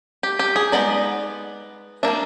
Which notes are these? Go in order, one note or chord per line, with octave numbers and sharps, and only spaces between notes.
G4
G4
G#4
G#3 B3 D#4 D5
G3 A#3 D4 E5